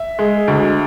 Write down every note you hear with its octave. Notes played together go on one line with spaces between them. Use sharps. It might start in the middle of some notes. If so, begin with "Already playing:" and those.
Already playing: E5
G#3
D2